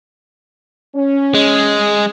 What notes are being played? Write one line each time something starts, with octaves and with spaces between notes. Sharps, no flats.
C#4
G#3